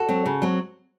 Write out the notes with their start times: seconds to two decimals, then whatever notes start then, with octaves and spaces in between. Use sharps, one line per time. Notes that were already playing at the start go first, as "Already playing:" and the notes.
Already playing: F#4 A4
0.09 F#3 C4
0.26 C#3
0.42 F#3 C4